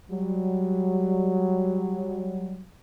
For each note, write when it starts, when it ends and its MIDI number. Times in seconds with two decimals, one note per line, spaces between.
0.11 2.62 54
0.11 2.62 55